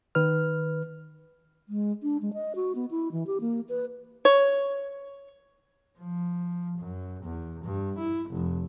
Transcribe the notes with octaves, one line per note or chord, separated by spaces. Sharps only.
D#3 B4 F6
G#3
D4
G#3
D#5
F#4
B3
E4
E3
G4
A#3
B4
C#5
F3
F#2
E2
G2
E4
F1